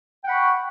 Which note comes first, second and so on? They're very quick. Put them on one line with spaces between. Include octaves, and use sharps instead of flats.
G5 F#5 B5 C#6